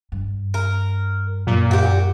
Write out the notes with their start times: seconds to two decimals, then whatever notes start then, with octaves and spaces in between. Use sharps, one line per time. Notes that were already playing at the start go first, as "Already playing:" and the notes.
0.12 G2
0.54 A#4
1.47 F#2 A#2
1.71 F#4 G4